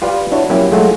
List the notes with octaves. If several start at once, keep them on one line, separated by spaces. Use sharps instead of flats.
F4 G4 B4 D5 F5 G5
D4 E4 F#4 C#5
F#3 A#3 C#4 E4 G4
F#3 G#3 A3 F4 F#4 G#4